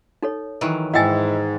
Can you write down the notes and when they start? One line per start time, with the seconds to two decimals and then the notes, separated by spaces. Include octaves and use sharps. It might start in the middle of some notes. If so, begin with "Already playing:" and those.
0.22 D#4 A4 C#5
0.61 D#3 E3 F#3
0.94 G#2 E4 D#5 G5 G#5 A6